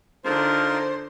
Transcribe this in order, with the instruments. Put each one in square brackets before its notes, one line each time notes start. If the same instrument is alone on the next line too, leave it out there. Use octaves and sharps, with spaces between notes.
[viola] D3 [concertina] D#4 F4 A#4 [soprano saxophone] C5